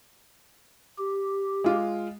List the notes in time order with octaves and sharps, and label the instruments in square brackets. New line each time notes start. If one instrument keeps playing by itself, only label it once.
[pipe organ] G4
[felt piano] G#3 F4